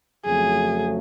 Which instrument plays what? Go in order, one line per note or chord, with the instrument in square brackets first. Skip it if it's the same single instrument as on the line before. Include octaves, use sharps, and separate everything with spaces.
[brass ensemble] F2 C#3 F#3 A3 [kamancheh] G#4